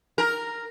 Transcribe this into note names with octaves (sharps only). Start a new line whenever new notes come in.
A#4